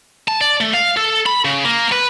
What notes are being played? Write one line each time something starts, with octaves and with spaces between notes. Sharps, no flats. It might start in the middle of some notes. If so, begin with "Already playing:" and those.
A5
D5
A3
F5
A4
B5
C#3
A#3
B4